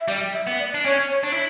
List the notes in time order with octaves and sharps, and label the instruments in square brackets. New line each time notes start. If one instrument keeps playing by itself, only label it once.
[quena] E5
[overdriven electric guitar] G3 [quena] D5
[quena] E5
[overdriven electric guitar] B3
[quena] D5
[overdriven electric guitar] D4
[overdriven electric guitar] C#4 [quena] C#5
[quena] C#5
[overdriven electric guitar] D4
E4